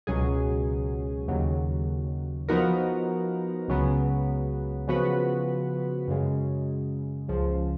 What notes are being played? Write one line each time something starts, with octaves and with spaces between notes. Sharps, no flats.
C#2 B2 F#3 C#4 G#4
D#2 C#3 F#3
F3 B3 D#4 F#4 A#4
C#2 C#3 F#3 B3
C#3 F3 B3 F#4 B4
F#2 C#3 G#3
C#2 C#3 F3